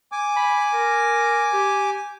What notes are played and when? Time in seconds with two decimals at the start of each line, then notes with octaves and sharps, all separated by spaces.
0.12 G#5 D6
0.36 B5
0.73 A#4
1.53 G4